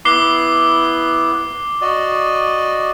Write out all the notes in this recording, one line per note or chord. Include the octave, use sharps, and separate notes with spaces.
B3 E4 D6 F#6 C7 G7
F#4 D5 D#5